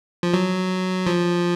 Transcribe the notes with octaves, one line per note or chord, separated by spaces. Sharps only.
F3
F#3
F3